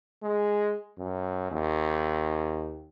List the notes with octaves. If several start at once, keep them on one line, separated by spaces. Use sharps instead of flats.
G#3
F#2
D#2